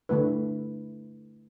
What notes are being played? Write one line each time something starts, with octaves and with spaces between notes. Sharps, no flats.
D3 A3 E4 B4